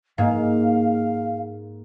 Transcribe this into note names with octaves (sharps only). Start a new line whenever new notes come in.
G#2 A#3 F5